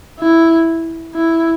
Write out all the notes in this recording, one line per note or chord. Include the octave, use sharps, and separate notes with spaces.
E4
E4